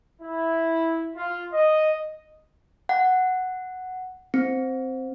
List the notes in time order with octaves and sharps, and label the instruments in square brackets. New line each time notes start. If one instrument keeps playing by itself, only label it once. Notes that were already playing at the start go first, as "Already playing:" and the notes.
[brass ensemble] E4
F4
D#5
[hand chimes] F#5
C4